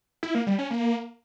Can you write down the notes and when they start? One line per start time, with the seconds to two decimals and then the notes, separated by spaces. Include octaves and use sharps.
0.23 E4
0.35 A#3
0.47 G3
0.59 C#4
0.70 A#3